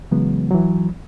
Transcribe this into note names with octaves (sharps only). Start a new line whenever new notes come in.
C#3 E3 F#3 G#3 B3
E3 F#3